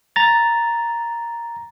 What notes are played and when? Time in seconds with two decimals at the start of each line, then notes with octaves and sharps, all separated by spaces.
0.16 A#5 A6